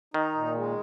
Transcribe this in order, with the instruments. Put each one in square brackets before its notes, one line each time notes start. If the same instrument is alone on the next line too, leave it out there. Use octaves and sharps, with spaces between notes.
[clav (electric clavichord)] D#3 [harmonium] D#4
[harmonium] A#2
G#3